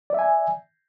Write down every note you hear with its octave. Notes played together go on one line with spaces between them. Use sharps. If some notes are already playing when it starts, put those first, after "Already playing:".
D5 E5 G#5